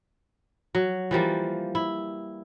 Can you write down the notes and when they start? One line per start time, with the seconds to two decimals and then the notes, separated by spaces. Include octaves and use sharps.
0.75 F#3
1.11 E3 F3 G3 A#3
1.75 E4